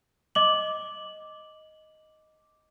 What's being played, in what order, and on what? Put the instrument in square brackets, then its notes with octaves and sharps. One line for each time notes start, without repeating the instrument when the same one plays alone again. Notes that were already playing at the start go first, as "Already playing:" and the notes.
[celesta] D#5 D6 F#7